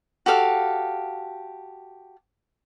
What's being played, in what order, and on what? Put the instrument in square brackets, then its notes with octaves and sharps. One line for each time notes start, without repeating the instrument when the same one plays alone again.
[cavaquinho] F#4 G4 A4 F5